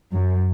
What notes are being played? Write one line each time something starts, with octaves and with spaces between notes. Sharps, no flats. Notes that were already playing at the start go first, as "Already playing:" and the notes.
F#2